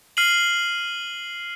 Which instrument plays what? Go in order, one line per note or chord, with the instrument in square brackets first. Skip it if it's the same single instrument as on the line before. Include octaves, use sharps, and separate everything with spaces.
[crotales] F6 C7 D#7 F#7